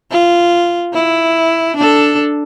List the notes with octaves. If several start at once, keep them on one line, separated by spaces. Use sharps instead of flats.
F4
E4
D4 A4